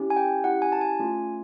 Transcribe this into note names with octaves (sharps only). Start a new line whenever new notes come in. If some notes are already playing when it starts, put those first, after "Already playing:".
Already playing: C#4 E4 G4
G#5
G5
C#4 E4 G4 F#5
G#5
A5
G#5
A3 C#4 F4 G#4